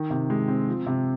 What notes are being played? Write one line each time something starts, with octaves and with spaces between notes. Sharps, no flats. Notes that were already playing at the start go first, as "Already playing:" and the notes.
Already playing: D#3
C3
G#3
C4
F3
C3